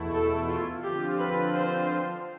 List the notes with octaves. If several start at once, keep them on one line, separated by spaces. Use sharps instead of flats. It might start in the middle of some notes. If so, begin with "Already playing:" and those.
Already playing: E2 B2 A3 E4
A4
F4
D3 F3 C4 F4 G4
B4
C5